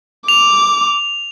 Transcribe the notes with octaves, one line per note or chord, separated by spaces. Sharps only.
D6 F7